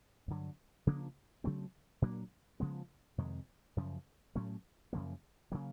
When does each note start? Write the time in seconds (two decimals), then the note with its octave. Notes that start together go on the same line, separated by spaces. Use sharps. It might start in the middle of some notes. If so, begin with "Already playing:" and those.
0.28 G2 D3 F#3
0.87 C#3 F3 A#3 D4
1.44 C#3 F#3 A3 C4
2.02 A#2 F#3 A#3 D4
2.60 C#3 F3 G#3 B3
3.18 F2 C3 D#3 G#3
3.77 F#2 C#3 F3
4.35 A2 F#3 A3 C#4
4.93 F#2 C#3 F3 A#3
5.52 C#3 F#3 A#3